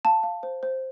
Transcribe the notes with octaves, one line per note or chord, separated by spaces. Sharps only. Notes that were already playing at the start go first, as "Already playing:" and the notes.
F5 A5
F5
C5
C5